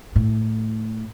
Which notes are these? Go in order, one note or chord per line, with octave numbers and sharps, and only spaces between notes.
A2